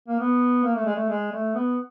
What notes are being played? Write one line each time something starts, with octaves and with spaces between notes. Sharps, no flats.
A#3
B3
A#3
A3
G#3
A3
G#3
A3
B3